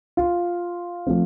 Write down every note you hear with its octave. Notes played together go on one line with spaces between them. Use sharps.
F4
F3 A3 C4